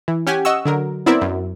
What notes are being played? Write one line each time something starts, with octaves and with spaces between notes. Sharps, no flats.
E3
C#4 G4 F#5 G#5
D#5 F#5 C#6 E6
D3 F#3 A#4
B3 C4 E4 A#4 D5 E5
F#2